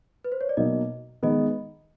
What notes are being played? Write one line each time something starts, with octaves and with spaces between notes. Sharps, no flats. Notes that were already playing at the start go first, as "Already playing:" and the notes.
B4
C5
C#5
D5
B2 F#3 A#3 D#4 D#5
D#3 G#3 B3 D#5